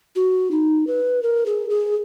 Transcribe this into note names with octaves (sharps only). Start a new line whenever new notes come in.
F#4
D#4
B4
A#4
G#4
G#4